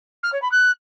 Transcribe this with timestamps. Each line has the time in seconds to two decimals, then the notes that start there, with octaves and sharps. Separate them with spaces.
0.23 F6
0.32 C#5
0.42 B5
0.51 F#6